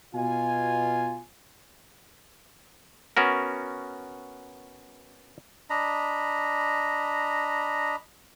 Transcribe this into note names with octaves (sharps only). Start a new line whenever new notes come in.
B2 F4 G#5
B3 C#4 F#4 A#4
D4 D#5 A#5 B5